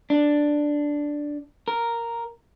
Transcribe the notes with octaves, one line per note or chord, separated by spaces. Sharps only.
D4
A#4